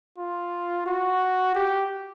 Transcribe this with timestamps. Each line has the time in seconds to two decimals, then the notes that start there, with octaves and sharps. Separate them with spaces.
0.18 F4
0.86 F#4
1.55 G4